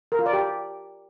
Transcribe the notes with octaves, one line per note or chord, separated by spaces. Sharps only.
A#4
F4
D5
G4